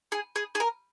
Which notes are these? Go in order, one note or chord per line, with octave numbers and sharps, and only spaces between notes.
G#4
G#4
G#4
A#4